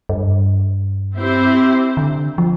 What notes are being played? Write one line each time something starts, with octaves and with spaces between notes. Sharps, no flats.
G2
C4 E4 G4 C5
D3
F3